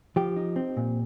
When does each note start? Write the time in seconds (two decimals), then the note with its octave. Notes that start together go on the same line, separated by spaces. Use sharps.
0.16 F3 G4
0.36 D#4
0.56 C4
0.77 A#2